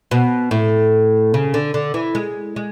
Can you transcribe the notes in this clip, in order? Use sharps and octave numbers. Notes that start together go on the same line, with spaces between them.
B2
A2
C#3
D3
D3
E3
G#3
G#3